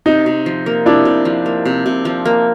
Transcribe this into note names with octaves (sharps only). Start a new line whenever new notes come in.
C3 D#4
C3
F3
A#3
C3 D4 E4
C3
F3
A#3
C3
C3
F3
A#3